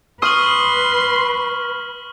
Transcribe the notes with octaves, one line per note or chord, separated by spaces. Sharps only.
B4 C6 C#6 D#6 F6 F#7